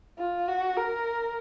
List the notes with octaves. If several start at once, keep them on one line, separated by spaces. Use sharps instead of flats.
F4
F#4
A#4